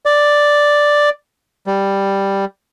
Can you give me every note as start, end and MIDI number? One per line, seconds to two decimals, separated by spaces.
0.06 1.10 74
1.67 2.45 55